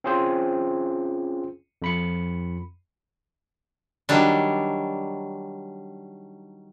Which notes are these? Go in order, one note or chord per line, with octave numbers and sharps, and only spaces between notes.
C4 C#4 F4 G#4 C5
F2 B5 C#7
D#3 F#3 G3 D4